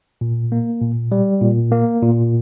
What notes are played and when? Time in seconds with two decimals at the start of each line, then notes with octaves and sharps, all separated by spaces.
0.21 A#2
0.52 A#3
0.81 A#2
1.12 G3
1.42 A#2
1.72 A#3
2.02 A#2